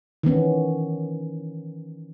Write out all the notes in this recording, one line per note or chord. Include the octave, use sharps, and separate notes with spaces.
D#3 E3 B3 C#4